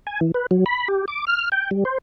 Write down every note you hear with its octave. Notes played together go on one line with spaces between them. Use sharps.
G#5
E3
B4
F#3
B5
G4
D6
F6
G5
G3
C5